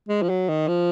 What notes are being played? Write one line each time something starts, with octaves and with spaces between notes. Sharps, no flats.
G#3
F3
F#3
D#3
F3